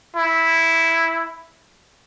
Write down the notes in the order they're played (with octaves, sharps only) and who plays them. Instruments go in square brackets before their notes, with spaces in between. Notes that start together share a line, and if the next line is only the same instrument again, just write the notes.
[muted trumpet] E4